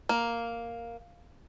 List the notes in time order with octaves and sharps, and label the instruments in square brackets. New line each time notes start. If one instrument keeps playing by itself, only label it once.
[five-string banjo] A#3